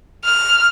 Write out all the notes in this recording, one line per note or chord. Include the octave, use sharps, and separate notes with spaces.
F6